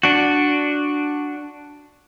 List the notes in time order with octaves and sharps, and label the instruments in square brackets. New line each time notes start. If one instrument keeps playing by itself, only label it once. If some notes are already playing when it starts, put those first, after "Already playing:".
[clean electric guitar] D4 F#4